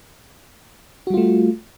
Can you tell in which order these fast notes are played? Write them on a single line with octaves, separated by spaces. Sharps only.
F#4 G3 F4 A3